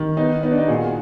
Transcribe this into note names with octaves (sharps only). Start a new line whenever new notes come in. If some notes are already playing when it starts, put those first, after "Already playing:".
Already playing: D#3
B3 D#4
B3 D#4
D4
D#4
A#2 F#4 G#4